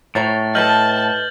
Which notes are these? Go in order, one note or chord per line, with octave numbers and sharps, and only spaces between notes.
A2 C5 C#5 A#5 A6
A4 B4 D#5 A5 F6 G6 F#7